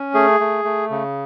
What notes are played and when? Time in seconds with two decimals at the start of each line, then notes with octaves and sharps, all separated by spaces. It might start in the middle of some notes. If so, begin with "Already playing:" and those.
Already playing: C#4
0.14 A3 G#4
0.40 A3
0.65 A3
0.90 C#3